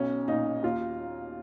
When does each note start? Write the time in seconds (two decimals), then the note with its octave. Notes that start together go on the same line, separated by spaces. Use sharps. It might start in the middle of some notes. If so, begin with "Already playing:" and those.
Already playing: B1 C#4
0.28 A#2 D#4
0.63 D#2 F4